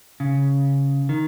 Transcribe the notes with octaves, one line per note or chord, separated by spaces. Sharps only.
C#3
D#3